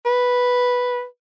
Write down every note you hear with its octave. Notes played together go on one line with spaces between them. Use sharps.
B4